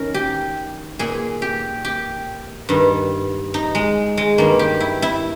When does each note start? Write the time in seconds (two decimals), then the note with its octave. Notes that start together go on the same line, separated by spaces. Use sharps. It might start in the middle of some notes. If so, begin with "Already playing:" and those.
Already playing: D#3 C#4 A#4
0.14 G4
0.99 A#2 G#4
1.42 G4
1.85 G4
2.69 G2 D#3
3.54 D#4
3.75 G#3
4.17 G#3
4.38 G2 D#3 A#3
4.59 G4
4.80 E4
5.02 E4